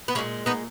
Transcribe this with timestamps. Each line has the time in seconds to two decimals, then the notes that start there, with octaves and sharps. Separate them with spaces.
0.08 B3
0.15 A#2 G#3 A#3 C#4
0.46 B3 D#4